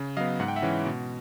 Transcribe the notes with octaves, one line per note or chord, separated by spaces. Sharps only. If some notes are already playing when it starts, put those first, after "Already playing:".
Already playing: C#3
F#3 B3 D#5 F5
G#2 F#5
G5
E5 F#5
E3 G#3 C#4 E4
B2